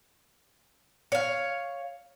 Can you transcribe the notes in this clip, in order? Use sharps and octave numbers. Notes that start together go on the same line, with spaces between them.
C#5 F5